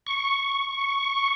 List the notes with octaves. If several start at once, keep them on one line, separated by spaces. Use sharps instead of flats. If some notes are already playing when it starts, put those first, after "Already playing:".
C#6